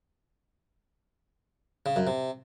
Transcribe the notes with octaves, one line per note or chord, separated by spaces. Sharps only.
C#3
F#2
C3